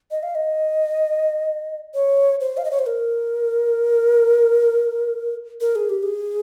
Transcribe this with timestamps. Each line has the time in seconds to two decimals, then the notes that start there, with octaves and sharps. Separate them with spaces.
0.11 D#5
0.23 F5
0.35 D#5
1.94 C#5
2.40 C5
2.57 F5
2.65 D#5
2.71 C#5
2.79 C5
2.86 A#4
5.61 A#4
5.75 G#4
5.89 G4
6.03 G#4